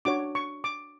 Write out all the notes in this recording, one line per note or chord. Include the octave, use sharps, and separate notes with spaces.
D4 F#4 C#5 D6
C#6
D6